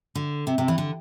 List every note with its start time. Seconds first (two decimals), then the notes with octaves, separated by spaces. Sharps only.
0.15 D3
0.47 C3
0.58 C3
0.68 E3
0.78 D3